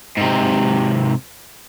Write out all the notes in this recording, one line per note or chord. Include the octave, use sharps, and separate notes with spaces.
G#2 C3